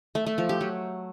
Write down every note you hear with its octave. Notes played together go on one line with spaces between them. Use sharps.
A3
A3
F3
G4
F#3